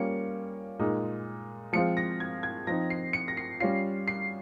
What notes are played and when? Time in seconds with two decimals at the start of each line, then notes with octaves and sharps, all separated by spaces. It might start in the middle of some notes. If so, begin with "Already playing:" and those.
Already playing: G3 A#3 C#4 F4 C#7
0.79 A#2 G#3 D#4
1.73 F3 G#3 C4 F4 C#7
1.97 A#6
2.20 G#6
2.43 G#6
2.67 F3 C4 D#4 A#6
2.90 C7
3.13 C#7
3.28 A#6
3.37 C7
3.60 G3 C#4 F4 C7
4.08 C7